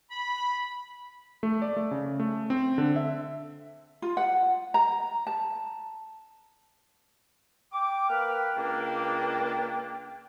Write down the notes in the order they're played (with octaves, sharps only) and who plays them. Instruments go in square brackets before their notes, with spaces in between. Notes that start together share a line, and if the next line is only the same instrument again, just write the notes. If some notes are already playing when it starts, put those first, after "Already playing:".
[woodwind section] B5
[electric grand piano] A3
D5
A3
C#3
A3
C4
D3
E5
[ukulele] F4
F#5
A#5
A5
[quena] G5 [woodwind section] D6
[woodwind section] A#3 B4 F6
C#2 A#3 D4